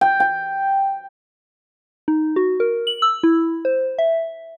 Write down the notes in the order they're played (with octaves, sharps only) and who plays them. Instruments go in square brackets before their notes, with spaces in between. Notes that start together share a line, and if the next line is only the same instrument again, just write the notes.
[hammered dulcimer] G5
G5
[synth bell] D#4
F#4
A#4
F#7
E6
E4
C5
E5